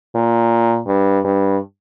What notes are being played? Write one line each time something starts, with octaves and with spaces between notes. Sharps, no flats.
A#2
G2
G2